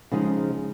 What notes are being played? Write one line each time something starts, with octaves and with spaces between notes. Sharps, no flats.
C#3 F3 G#3 D#4